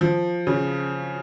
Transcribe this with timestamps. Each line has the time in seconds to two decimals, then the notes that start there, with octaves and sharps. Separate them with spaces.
0.01 F3
0.47 C#3